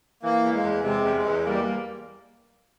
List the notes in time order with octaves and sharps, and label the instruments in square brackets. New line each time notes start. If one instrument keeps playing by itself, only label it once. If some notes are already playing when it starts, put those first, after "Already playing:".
[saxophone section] E3 [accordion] A#3
[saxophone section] E2
[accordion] G#3
[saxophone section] E2
[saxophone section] C3 [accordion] G#3
[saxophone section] E2
[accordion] G#3
[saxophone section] E2
[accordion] G3 [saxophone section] A#3